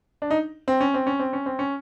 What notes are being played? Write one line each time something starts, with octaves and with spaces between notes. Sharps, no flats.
D4
D#4
C4
C#4
C4
C#4
C4
C#4
C4
C#4